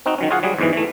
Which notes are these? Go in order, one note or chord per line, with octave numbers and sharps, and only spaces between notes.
C4 D#4 F#4
D#3 F#3 C#4
F4 F#4 G#4 F5 F#5
F#3 G3 G#4
E2 G#2 E3
E3 A3